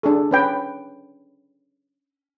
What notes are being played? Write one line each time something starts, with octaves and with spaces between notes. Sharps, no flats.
D4 G#4 A4
C#4 B4 G5